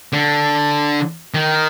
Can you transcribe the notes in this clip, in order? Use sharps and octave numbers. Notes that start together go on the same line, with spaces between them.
D3
D#3